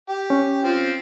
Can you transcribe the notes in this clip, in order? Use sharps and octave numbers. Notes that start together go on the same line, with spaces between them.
G4
C#4
F3 C4